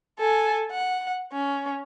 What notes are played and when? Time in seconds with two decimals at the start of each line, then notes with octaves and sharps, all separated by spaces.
0.19 A4 G#5
0.71 F#5
1.32 C#4